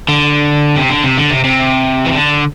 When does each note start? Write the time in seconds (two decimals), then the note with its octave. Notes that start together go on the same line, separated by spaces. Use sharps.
0.09 D3
0.77 C3
0.90 D3
1.04 C3
1.18 D3
1.31 C3
1.44 C3
2.06 E3
2.13 D3